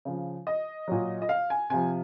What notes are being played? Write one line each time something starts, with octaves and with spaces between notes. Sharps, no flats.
C#3 F3
D#5
A#2 F#3
D#5
F5
G#5
C3 F3 G#5